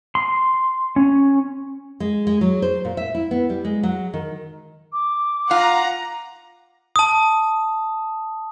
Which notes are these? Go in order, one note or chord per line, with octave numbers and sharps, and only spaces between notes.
C6
C#4
G#3
G#3
F#3
C5
A#2
E5
E4
B3
G3
G#3
F#3
D#3
D6
F4 F#5 A#5
A5 D#6